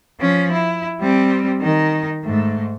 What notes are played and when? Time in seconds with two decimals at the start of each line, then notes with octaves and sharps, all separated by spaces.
0.20 F3 C#4
0.52 E4
1.00 G3 C4
1.61 D#3 D#4
2.24 G#2 A3